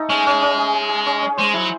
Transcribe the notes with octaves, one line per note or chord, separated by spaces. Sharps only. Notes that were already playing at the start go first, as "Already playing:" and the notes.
Already playing: A3 D#4 A4
G#3 C#4
C#4
C#4
G#4
G#4
G#4
C#4
C#4
G#3 C5
F#3 E4